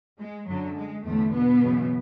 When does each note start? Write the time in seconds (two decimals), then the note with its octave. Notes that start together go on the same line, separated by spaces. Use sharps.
0.19 G#3
0.48 F#2 D3 F#3
0.76 G#3
1.04 E2 A2 D3 A3
1.33 B2 B3
1.61 F#2 C#3 E3